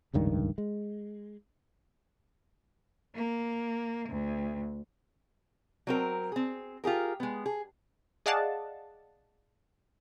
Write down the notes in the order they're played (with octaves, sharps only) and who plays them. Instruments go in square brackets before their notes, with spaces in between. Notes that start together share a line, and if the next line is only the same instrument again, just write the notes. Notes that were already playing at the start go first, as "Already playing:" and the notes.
[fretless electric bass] F1 C#2 G2 D#3
G#3
[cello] A#3
D2
[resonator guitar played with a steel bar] F#3 C4 A#4
C4 G#4
F4 G4 G#4 A#4
G#3 B3
G#4
[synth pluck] G#4 D5 D#5 F5 F#5 A5